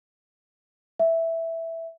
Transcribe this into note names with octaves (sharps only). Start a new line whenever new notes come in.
E5